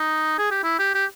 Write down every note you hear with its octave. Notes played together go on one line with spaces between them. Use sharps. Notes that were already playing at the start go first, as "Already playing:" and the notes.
Already playing: D#4
G#4
G4
E4
G4
G4